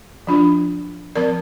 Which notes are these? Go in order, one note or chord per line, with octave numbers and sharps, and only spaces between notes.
F3 D4 F4
F3 C4 A#4 D5